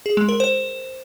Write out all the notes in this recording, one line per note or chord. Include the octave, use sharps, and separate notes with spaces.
G#4
G#3
A#4
C5